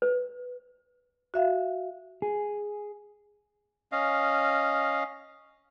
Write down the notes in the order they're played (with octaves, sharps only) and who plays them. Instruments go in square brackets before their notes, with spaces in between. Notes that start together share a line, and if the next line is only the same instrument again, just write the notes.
[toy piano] B4
[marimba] F#4 E5 F5
[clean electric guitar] G#4
[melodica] C#4 D#5 F5